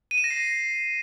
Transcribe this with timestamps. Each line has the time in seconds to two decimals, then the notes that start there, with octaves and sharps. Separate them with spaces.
0.11 D#7
0.18 E7
0.24 A#6
0.31 C7